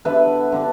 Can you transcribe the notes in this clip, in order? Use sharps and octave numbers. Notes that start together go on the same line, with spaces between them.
D3 B3 D4 B4 E5
D3 B3 D4